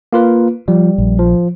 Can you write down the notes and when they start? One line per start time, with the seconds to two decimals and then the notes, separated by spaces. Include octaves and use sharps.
0.13 A#3 F4 B4
0.68 F3 G3
0.98 A#1
1.19 F3